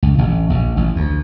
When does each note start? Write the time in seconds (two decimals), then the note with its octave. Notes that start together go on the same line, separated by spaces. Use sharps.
0.03 C#2
0.18 A1
0.50 A#1
0.77 A1
0.96 D2